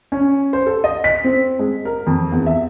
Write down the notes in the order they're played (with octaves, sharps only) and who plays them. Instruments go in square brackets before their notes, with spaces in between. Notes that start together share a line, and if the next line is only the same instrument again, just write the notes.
[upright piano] C#4
C5
A4
D#5
B6
C4
G#3
A#4
F2
E2
E5